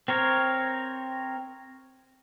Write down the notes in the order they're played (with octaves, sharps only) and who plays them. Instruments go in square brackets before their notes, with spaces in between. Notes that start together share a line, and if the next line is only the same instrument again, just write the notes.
[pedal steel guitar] C4 A#4 C#5